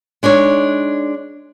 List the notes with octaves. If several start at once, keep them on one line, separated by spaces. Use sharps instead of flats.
G#3 D4 D#4 C#5